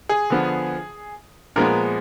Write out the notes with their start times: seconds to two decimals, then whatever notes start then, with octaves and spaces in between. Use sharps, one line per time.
0.09 G#4
0.30 D3 F3 B3
1.56 A#2 F3 G#3 B3 A#4